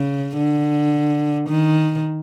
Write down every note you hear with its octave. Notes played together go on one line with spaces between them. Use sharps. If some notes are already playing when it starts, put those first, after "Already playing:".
Already playing: C#3
D3
D#3